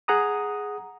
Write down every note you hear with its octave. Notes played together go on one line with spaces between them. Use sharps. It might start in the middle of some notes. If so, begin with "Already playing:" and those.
G#4 F#5 A#5 D#6